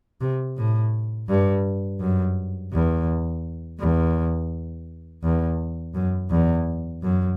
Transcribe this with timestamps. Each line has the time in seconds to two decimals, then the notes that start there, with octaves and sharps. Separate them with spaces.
0.21 C3
0.57 A2
1.28 G2
2.00 F#2
2.72 E2
3.79 E2
5.23 E2
5.95 F#2
6.30 E2
7.02 F#2